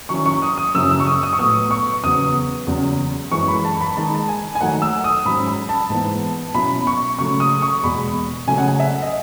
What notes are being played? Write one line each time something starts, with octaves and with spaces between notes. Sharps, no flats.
D#3 F#3 C#4 E4 C#6
C#6
D#6
D#6
F#2 C#3 F#3 C#4 E4 E6
E6
C#6
D#6
D#6
C#6
A2 F#3 B3 D#6
C#6
E2 C#3 F#3 B3 D#6
E2 C#3 F#3 C#4
F#2 E3 G#3 C#6
B5
A5
B5
D#3 G#3 D#4 A5
G#5
G#5
D#3 F#3 A3 D#4 F#5
E6
D#6
G#2 F#3 C#4 B5
B5
A5
G#2 E3 B3
B2 F#3 C#4 E4 B5
C#6
C#3 F#3 A3 C#6
D#6
C#6
E2 B2 G#3 B5
C#3 F#3 A3 C#4 G#5
F#5
G#5
E5
D#5